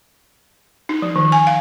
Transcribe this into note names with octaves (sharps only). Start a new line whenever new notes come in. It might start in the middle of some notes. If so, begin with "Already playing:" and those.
D#4
F3
D#3
G#5
F5